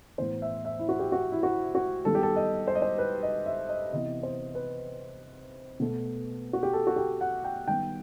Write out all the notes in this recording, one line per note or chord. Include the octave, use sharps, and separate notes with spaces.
A2 E3 B3 C5
E5
E5
E4
F#4
G4
F#4
E4
F#4
F#4
D#3 G3 B3 A4
G4
A4
D#5
C5
D#5
C5
B4
D#5
E5
D#5
C3 E3 B3 D#5
C5
B4
B2 A3
F#4
G4
A4
F#4
G4
F#5
G5
D#3 G3 B3 G5